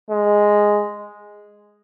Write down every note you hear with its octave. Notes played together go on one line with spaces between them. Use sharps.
G#3